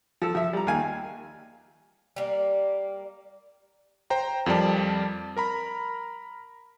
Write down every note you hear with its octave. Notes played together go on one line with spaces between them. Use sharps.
F3 A4
F3 E5
G3 A#5
D#2 F5 G#5
G3 A#3
C5 G5 A#5
F2 F3 G3 A#4 D5 A5
A#4 A#5 B5